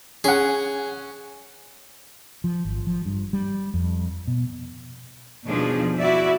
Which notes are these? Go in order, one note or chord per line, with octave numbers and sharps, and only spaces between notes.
C#4 G#4 F#5
F3
G#1
F3
G2
G3
F2
B2
D#2 B2 F3 G3 D4 G#4
E4 F#4 D5 E5